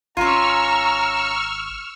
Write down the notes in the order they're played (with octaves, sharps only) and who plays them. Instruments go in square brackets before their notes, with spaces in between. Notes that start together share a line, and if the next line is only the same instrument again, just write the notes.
[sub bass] G#1 [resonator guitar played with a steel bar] C#4 F4 [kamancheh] A#5 [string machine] C#6 E6 F6